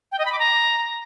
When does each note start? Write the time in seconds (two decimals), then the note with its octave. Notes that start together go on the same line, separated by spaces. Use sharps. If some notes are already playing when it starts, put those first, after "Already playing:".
0.12 G5
0.19 D#5
0.25 B5
0.32 D6
0.39 A#5